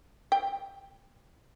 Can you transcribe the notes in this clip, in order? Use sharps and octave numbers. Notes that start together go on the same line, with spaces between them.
G5